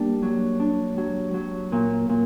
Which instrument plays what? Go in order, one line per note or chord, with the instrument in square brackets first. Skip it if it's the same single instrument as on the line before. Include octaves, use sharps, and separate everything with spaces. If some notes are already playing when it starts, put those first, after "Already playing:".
Already playing: [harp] G3 A#3 D4
F#3
D4
F#3
F#3
A#2
A#2